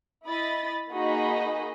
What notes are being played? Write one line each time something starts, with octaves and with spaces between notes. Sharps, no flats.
E4 D#5 B5 A6
A#3 D#4 F#4 G#4 D#5 B5